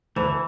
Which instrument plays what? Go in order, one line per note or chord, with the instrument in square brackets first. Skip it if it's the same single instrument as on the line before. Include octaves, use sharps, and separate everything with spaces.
[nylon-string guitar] D2 [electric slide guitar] E3